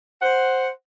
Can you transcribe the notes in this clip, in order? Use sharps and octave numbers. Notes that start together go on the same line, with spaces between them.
C5 F#5